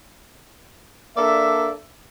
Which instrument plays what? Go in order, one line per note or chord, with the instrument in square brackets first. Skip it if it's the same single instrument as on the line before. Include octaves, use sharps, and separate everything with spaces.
[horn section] A#3 D4 A4 D5 E5